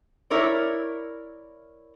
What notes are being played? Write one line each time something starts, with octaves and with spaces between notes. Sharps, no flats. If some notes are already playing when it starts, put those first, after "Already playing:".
E4 A#4 C#5 D5